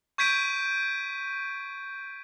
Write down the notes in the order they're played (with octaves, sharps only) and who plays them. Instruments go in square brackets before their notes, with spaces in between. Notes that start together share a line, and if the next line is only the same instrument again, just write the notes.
[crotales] C#6 G6 G#6 B6 D7 D#7